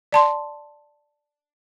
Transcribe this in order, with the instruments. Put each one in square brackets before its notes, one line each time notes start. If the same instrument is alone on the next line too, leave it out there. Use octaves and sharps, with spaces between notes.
[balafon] D5 A5 C6